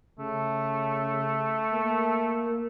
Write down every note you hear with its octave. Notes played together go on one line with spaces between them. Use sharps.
C#3 A3
A#3